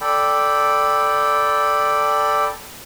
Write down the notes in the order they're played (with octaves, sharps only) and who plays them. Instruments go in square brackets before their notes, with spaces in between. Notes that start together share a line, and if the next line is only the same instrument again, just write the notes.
[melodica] A4 D5 G5 B5